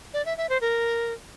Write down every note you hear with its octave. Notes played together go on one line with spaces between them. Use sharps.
D5
E5
E5
C5
A#4